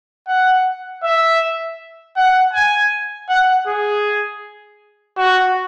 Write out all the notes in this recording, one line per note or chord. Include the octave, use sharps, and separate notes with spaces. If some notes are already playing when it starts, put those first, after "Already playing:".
F#5
E5
F#5
G#5
F#5
G#4
F#4